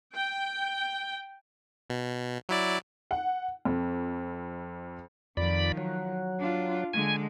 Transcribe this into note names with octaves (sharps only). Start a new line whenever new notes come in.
G5
B2
F#3 E4 D5
F#5
F2
F2 D#3 F3 D5 B5
F#3
D4 F4
D3 G#3 G#5